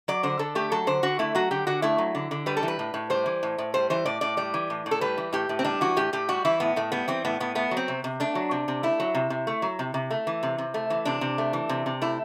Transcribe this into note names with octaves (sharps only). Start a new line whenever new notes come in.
F#3 D5
D3 C5
D3 A4
A3 G4
F#3 A4
D3 C5
D3 F#4
A3 E4
F#3 F#4
D3 G4
D3 F#4
A3 E4
F#3
D3
D3
G3 B4
A4
E3
B4
A2
A2
G3 C5
E3
A2
A2
G3 C5
E3 C5
A2 D5
A2 D5
G3 D5
E3
A2
A2
A4
G3 B4
E3
A2 G4
A2
C4
G3 D4
E3 F#4
A2 G4
A2 G4
G3 F#4
E3 E4
A2 B3
A2 A3
G3 B3
E3 C4
A2 B3
A2 B3
A3 B3
F#3
C4
C3
C3
A3 D4
F#3
C3
C3
A3 E4
F#3
C3
C3
A3
F#3
C3
C3
A3
E3
C3
C3
A3
E3
C3 D4
C3
A3
E3
C3
C3
A3 E4